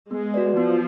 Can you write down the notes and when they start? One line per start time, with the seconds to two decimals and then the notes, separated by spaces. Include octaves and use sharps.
0.11 G#3 B3
0.34 F#4 B4 D5
0.57 F3 B3